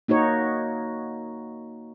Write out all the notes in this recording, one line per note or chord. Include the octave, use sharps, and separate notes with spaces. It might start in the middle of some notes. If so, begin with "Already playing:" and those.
A#3 D#4 F#4 C#5